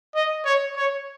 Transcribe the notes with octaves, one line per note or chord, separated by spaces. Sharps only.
D#5
C#5
C#5